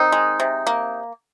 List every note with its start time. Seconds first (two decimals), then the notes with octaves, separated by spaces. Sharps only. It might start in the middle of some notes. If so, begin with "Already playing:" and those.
Already playing: D#3 C4 D#4
0.12 G#3
0.40 C3
0.67 A#3